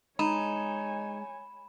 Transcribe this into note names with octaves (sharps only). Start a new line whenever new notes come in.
G#3 D#4 C#5 G#5 B5 E7